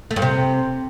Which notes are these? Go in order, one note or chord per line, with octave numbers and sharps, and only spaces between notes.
A3
G2
C3